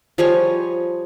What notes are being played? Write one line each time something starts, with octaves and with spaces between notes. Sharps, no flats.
F3 G3 G#4 C#5